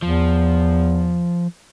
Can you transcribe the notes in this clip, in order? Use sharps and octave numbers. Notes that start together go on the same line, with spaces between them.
E2 F3